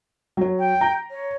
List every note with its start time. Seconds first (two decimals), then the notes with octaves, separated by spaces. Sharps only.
0.37 F#3 C#5
0.59 G5
0.81 A#5
1.11 C#5